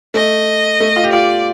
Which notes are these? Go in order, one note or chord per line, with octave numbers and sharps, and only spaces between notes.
A3 D#5
A3
F4
G4
F4 D5